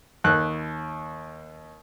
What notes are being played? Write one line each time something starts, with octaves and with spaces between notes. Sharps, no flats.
D#2 F#6